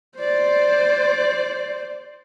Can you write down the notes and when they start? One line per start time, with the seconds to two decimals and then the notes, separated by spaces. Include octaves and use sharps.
0.18 C5 D5